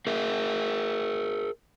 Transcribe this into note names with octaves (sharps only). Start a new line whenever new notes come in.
G#4 A#4 E5